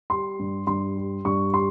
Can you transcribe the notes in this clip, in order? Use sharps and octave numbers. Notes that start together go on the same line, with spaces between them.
G3 C6
G2
G2 C6
G3
G2 C#6
G3 C6